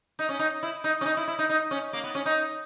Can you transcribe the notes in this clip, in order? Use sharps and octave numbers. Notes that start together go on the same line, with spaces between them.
D#4
C#4
D#4
E4
D#4
C#4
D#4
E4
E4
D#4
D#4
C#4
A#3
B3
C#4
D#4